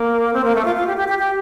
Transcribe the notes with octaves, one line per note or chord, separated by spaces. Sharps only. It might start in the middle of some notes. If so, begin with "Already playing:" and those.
Already playing: A#3
C4
A#3
A3
F4
F4
G4
G4
G4
G4